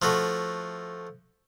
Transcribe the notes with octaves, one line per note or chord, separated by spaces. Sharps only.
F3 A3 F#4